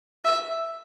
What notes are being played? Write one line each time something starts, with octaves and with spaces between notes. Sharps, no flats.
E5